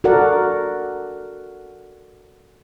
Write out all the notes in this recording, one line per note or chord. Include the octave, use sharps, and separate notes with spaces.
F#4 A4 A#4 D5 F#5